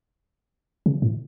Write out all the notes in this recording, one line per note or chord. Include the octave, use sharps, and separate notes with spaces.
C#3
A2